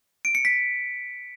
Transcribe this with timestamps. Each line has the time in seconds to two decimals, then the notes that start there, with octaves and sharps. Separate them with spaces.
0.25 D7
0.35 C#7
0.45 B6